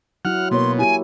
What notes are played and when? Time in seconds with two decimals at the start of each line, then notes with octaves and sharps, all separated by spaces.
0.25 F#3 E4 F#5 F6
0.51 B2 A#3 C#5 C6
0.78 E4 G4 G#5